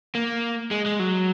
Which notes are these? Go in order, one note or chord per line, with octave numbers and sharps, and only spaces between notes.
A#3
G#3
G#3
F#3